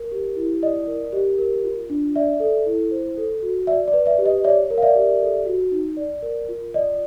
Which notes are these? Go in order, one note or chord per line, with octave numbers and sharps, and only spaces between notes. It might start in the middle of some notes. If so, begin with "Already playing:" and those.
Already playing: A#4
G4
E4
D5 D#5
A#4
G4
A#4
F4
D4
D5 E5
A4
E4
C5
A4
F#4
D5 E5
D5
B4
D5 E5
G4
D#5
C#5 D5 E5
A#4
F5
D5 E5
G4
A4
F#4
D#4
D5
A#4
F4
D5 D#5